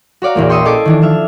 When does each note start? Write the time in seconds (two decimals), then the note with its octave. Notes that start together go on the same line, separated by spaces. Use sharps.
0.22 F#4 C#5 D5 F5 A#5
0.35 A#1 E2 A#3
0.49 G5 C6 C#6 D#6 E6
0.65 C#4 A4 D#5 D6 G#6 C7
0.85 D#3 E3 D4
1.02 F3 E5 F6